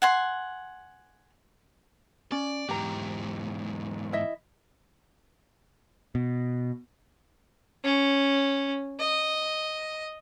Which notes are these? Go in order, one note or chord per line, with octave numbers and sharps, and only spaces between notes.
F#5 G#5 C6
C#4 D5
E2 G#2 G4 A#5
E4 D#5 E5
B2
C#4
D#5